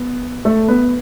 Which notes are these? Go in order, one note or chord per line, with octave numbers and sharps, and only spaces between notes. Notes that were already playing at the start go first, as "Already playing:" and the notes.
Already playing: B3
A3 A4
B3 B4